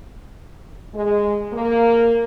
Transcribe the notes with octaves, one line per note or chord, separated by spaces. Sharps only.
G#3
A#3